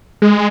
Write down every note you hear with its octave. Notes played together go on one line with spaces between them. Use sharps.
G#3